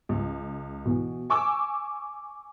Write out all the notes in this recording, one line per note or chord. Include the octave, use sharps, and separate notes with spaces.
C#2
B2 E3
G#5 C#6 D6 E6